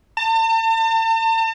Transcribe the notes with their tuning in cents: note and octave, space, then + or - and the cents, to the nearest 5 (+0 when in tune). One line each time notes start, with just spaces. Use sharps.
A5 +40